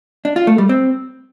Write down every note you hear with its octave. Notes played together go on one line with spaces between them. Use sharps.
D4
F4
A3
G3
C4